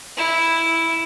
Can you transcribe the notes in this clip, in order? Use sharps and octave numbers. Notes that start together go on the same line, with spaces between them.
E4